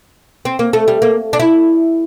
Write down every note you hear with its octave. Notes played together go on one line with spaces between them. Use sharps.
C4
A#3
A3
G3
A#3
D4
E4